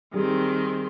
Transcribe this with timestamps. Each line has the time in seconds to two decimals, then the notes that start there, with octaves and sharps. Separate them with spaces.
0.14 D#3 G3 C4 G#4